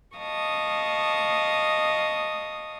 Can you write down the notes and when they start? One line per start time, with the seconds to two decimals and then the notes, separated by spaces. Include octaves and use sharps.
0.16 D#5 F5 A5 C#6 D#6